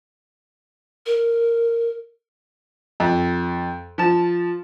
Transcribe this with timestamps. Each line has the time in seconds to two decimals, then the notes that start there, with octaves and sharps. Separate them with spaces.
1.06 A#4
3.00 F2
3.98 F3 A5